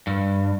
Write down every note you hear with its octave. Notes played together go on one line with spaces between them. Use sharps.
G2